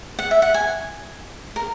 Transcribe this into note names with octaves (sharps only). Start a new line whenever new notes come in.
F#5
E5
F#5
G#5
A#4